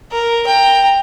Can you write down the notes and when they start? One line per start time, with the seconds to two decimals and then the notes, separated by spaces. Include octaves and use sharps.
0.12 A#4
0.47 G5 A#5